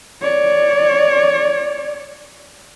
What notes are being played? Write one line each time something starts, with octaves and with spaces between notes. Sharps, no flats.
C#5 D5